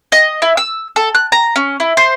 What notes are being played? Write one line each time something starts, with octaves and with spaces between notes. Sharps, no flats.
D#5
E4
E6
A4
F#6
A#5
C#4
E4
C5